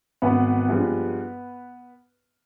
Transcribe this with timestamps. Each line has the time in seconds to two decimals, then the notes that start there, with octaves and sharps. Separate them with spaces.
0.22 G#1 B3 B4
0.69 G2 F3 G#3